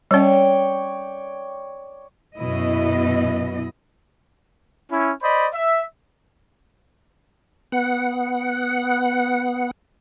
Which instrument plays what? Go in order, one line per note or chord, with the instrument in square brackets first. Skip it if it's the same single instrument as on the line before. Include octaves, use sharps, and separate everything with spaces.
[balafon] G3 C#4 [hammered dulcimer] C#5 D5 G5
[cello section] F#2 B2 B3 E4 D#5
[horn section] C#4 E4
C5 D5 D#5 B5
E5
[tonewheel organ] B3 F#5